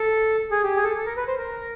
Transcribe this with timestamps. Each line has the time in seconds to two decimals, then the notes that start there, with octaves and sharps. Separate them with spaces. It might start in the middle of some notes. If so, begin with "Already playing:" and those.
Already playing: A4
0.51 G#4
0.63 G4
0.76 G#4
0.84 A4
0.96 A4
1.06 A#4
1.17 B4
1.27 C5
1.38 A#4